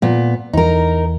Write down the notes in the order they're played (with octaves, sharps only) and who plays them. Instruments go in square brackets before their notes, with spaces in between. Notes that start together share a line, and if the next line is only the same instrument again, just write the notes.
[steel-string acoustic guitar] A#2 B3
[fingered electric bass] E2 [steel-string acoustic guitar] D#4 A#4